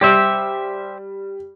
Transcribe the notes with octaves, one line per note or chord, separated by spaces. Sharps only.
G3 G4 C5 E5